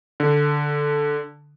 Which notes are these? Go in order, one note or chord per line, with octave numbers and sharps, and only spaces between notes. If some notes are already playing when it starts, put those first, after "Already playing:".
D3